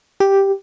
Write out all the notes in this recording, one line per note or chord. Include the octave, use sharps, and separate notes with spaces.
G4